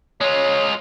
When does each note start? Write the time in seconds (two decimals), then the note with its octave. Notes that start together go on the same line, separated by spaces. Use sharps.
0.21 G#3 F4 C#5